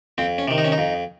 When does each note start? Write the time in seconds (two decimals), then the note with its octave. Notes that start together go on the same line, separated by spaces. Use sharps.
0.18 F2 C4
0.38 C#4
0.48 C3 D#3
0.58 D#4
0.64 C#4
0.72 D#4
0.78 F2